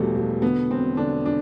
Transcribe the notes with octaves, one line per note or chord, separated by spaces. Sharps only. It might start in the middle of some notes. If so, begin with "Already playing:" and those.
Already playing: E1 E2 B2 E3 F3 G3 A3
B2
D3 B3
E1 C4
D3 D4
D4